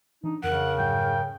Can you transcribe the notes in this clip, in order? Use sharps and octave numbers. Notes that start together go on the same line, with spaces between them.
E3 D4 D#4
F2 C#3 A#4 F#5
F2 G#2 F#3 G5